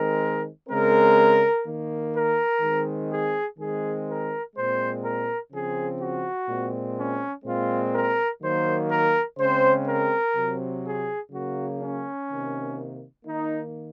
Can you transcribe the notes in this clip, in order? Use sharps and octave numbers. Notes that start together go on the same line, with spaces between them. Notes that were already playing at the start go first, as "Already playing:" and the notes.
Already playing: D#3 G#3 C4 A#4
C#3 G#3 C4 A#4
D#3 A#3
A#4
D#3 G#3 C4
G#4
D#3 G#3 C4 G#4
A#4
A#2 G#3 C4 C5
A#4
C#3 F3 C4 G#4
F#4
A#2 G#3 C4
C#4
A#2 G#3 C4 F4
A#4
D#3 F#3 A#3 C5
A#4
C#3 G#3 C4 C5
A#4
C3 F#3 C4
G#4
C#3 F#3 A#3 F#4
C#4
C3 D#3 A#3
D#3 A#3 D#4